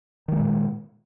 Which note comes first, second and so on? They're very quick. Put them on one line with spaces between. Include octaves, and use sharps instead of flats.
D#3 G3 G#3 A#2